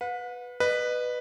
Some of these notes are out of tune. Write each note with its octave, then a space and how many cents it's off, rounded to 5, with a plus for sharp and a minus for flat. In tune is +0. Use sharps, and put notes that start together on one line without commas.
B4 +0 F#5 -45
B4 +0 D#5 -35